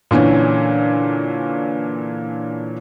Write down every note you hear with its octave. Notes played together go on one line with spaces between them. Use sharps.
A#2 D3 E3 C#4